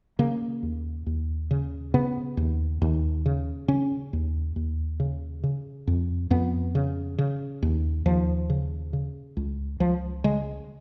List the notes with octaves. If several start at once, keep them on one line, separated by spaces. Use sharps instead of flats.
C#3 A#3
D#2
D#2
C#3
C#3 B3
D#2
D#2
C#3
C#3 C#4
D#2
D#2
C#3
C#3
F2
F2 B3
C#3
C#3
D#2
D#2 F3
C#3
C#3
C#2
C#2 F3
C#3 G#3